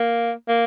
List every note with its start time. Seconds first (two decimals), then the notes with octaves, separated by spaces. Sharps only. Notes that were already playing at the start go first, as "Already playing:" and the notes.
Already playing: A#3
0.48 A#3